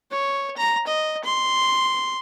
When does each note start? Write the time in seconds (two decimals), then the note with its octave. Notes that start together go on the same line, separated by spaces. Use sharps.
0.12 C#5
0.57 A#5
0.87 D#5
1.25 C6